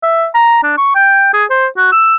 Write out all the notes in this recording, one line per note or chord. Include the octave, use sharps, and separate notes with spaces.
E5
A#5
D4
C#6
G5
G#4
C5
F#4
E6